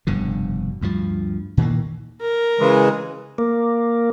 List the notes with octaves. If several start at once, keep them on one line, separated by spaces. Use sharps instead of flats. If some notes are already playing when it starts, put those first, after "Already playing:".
F1 G2 B2 D3
D2 G2 F3
A#2 D#3 E3 A#3
A#4
C#3 E3 G#3
A#3